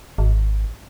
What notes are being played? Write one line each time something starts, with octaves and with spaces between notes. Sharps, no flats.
G#1